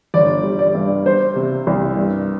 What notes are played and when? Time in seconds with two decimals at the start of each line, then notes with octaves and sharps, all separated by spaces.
0.14 G1 D5
0.44 G3
0.59 D5
0.75 G2
1.06 G3 C5
1.36 C3
1.67 C2
1.97 G2